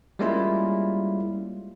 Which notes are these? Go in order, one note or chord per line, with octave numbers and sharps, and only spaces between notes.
G3 G#3 A#3 C#4 E4 F4